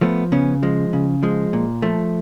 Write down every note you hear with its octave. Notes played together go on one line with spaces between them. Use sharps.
F3 A3 B3
C#3 B3 C#4
F3 G#3
C#3
F3 G#3
A#2
F3 A3